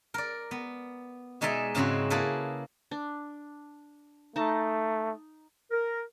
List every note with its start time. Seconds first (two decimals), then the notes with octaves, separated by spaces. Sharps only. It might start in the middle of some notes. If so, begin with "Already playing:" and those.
0.14 A#4 D5
0.51 B3
1.41 B2 G#3 D#4 D5 E5 G#5
1.75 G#2 C#3 G#3 C4 E4 F#4
2.10 A#3 E4 G#4 A4 B4
2.91 D4
4.36 A3 D#4 A5
5.71 A#4